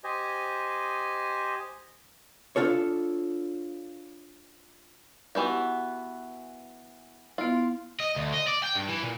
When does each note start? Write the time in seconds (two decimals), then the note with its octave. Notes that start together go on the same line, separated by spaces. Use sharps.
0.04 G4 C5 D#5 G#5
2.56 D4 F4 A4 C#5
5.35 E3 B3 F#4 G4 G6
7.38 B3 E4 F4
8.00 D#5
8.16 D2
8.34 D#5
8.47 D5
8.63 G5
8.75 G2
8.88 E3
9.02 A#2